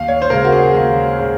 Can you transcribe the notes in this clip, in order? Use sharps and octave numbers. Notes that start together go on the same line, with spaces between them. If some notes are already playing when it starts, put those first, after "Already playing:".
Already playing: D#2 F5
C#5
C5
C#3 G#3 A#4
F#4
G#4
D#2 F#4
C#3 G#3